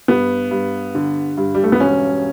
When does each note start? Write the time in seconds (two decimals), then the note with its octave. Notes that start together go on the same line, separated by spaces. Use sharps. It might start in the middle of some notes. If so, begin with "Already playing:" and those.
0.08 G2 B3
0.51 G2
0.95 D3
1.37 G2
1.55 G3
1.64 A3
1.72 B3
1.80 E1 C#4